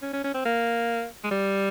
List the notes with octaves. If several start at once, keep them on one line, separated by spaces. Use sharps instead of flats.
C#4
C#4
C#4
C4
A#3
G#3
G3